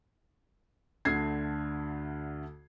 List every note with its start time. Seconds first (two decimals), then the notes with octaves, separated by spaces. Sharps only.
1.05 D2 D3 A3 G#6 C7